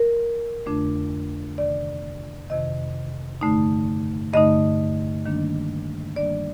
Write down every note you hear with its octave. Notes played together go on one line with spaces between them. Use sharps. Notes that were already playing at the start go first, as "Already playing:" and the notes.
Already playing: A#4
F2 D3 A3 D4
F2 C3 D#3 D5
F2 C3 D#3 D#5
G2 D3 A3 D#4
G2 D3 A3 D#4 D#5
D#3 G3 A#3 D4
D#3 G3 A#3 D4 D5